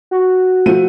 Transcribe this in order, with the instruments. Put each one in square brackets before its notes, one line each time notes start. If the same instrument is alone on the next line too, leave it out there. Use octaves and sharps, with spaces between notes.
[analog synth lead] F#4
[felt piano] F3 A3 D#7